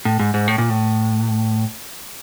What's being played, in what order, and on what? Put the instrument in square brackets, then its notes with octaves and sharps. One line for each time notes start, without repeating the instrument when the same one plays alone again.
[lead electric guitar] A2
G#2
G#2
A2
A#2
A2